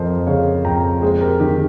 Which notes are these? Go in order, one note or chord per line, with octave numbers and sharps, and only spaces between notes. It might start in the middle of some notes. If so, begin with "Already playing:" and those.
Already playing: F2 F3 A#4 C5 D#5
C#3 C#5 F5
F2 G5 A#5
G#3 G#4 C5
G4 A#4
D#3 G4 A#4